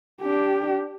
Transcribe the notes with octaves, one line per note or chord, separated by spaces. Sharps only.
D4 G4